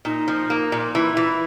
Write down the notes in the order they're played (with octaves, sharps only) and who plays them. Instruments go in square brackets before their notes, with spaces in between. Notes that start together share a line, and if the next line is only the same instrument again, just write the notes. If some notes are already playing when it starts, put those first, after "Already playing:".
[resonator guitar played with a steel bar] A#2 [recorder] D#4
[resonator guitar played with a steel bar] F3
A#3
A#2
[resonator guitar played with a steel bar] E3 [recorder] E4
[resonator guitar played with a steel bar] E3